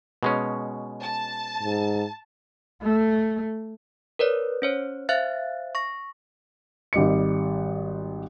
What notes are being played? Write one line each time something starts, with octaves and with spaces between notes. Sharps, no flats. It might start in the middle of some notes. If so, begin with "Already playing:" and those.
B2 G#3 C#4
A5
G#2
A3
A#4 B4 C#5 D5
C#4 C5 C#5
C5 E5 F5 F#6 A6
C#6 A#6
G#1 G3 D#5 C#7